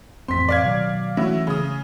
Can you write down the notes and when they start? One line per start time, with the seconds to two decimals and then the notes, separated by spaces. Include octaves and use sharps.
0.28 A1 F2 C4 C6 B6
0.49 D5 F5 G#6
0.63 B2 D#3 F#3
1.17 E3 F#3 A3 C#4 E4
1.47 C#3 D#6